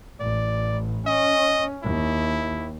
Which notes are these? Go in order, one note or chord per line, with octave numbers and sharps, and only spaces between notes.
A1 D5
C#4 D#5
D#2 E4